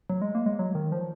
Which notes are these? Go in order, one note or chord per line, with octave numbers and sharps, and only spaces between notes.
F#3
G#3
A#3
G#3
F#3
D#3
F3